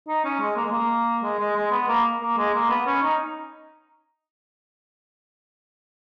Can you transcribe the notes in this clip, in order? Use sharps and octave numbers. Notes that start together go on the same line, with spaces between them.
D#4
C#4
G#3
A#3
G#3
A#3
G#3
G#3
G#3
B3
A#3
A#3
G#3
A#3
B3
C#4
D#4